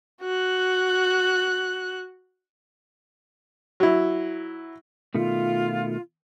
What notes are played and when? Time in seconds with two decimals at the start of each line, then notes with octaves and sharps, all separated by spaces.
0.22 F#4 F#6
3.80 F#3 E4
5.15 B2 D#3 A3 F4